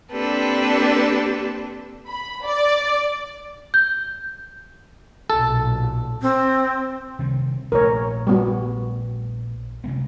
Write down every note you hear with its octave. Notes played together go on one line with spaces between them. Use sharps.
A#3 C4 D4 G4 A4 B4
B5
D5
G6
B1 A#2 A4
C4
C3 D#3 G3
A#1 A3 A#4 C#5
G3 B3 F#4
C3 G#3 B3